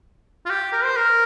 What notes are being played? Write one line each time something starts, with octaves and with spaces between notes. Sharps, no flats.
F4
G4
A#4
C5
A#4